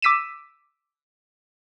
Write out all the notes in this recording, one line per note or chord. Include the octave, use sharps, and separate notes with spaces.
D6 E6 B6 D#7 E7